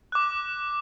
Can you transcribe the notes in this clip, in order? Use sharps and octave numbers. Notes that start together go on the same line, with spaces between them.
D6 F#6